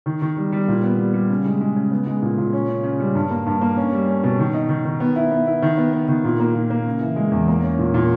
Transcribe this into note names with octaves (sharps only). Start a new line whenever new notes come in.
D#3
D#3
G3
G3
A#2
B3
G3
G3
C#3
G#3
G#3
C#3
B3
G#3
A#2
A#2
C#4
C#3
C#3
G3
G2
A#3
G2
A#3
C#4
G3
C#4
B2
D#3
D#4
D#3
D#3
B3
E4
B3
E4
D#3
B3
B3
D#3
A#2
A#3
A#2
A#3
C#3
E3
G#3
E2
A#3
C#4
A#2
A#2